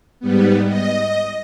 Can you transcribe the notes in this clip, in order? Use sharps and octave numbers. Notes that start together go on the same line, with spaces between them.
G#2 G3 B3
D#5